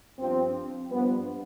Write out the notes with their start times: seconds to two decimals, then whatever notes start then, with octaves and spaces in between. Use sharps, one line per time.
0.19 G2 F3 C4
0.91 G2 F3 B3